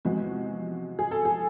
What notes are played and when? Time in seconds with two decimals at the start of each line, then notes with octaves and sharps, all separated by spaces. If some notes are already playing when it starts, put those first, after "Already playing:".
0.05 E2 C3 F3 G#3 F#4
0.99 G#4
1.11 A4
1.25 G#4